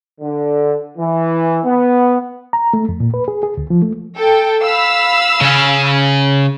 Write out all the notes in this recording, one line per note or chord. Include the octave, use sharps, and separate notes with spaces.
D3
E3
B3
A#5
A3
F2
A#2
B4
G#4
G#4
D2
F3
A3
A4 G5
F5 B5 E6
C#3 C#4